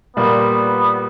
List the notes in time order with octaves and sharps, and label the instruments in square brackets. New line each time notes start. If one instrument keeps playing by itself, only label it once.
[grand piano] A#2 G3 A#3 [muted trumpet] B3